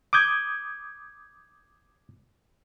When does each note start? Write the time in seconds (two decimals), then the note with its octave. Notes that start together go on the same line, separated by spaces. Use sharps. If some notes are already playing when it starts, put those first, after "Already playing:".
0.13 D6 D#6 G6 G#6